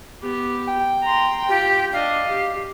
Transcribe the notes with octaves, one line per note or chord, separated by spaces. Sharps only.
B3 G4
G5
A#5 C6
F4 G4
D4 D#5 F5
G4